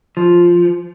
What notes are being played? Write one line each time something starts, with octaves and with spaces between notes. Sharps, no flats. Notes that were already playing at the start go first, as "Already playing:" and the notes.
F3